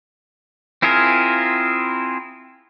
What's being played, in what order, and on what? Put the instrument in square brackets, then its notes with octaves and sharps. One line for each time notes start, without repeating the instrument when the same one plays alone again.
[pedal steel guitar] C4 E4 F4 G#4 A#4